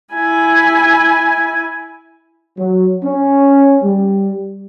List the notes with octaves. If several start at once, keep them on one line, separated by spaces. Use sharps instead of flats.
E4 G#5
F#3
C#4
G3